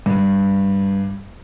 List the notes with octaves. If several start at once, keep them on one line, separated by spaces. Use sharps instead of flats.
G2